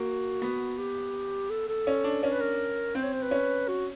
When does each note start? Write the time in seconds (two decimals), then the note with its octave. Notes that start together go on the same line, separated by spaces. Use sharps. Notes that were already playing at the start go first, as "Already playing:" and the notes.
Already playing: A#3 F#4
0.42 B3
0.78 G4
1.50 A4
1.69 A4
1.87 C#4
2.04 D4
2.23 C#4 A#4
2.32 B4
2.41 A#4
2.95 C4 C5
3.04 C#5
3.13 C5
3.22 B4
3.31 C#4
3.68 F#4